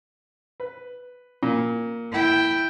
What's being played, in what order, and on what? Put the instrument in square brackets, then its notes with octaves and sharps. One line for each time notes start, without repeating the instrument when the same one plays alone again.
[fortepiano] B4
A#2
[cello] E4 G5